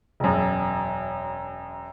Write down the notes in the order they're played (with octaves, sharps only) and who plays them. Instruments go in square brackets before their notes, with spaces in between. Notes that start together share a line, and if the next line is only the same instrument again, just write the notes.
[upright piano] E1 F#2